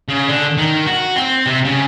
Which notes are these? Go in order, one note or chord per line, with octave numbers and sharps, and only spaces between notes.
C#3
D3
D#3
F#4
C4
C3
C#3